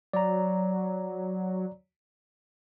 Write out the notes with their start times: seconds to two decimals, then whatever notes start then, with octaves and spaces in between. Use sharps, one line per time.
0.13 F#3 D5 A#5